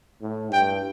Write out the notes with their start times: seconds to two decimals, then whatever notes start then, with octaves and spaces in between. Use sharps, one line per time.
0.22 A2
0.52 G2 G5